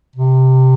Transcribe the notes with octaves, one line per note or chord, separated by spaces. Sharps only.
C3